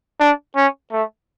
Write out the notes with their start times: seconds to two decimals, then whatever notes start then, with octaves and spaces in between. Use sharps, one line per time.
0.20 D4
0.56 C#4
0.92 A3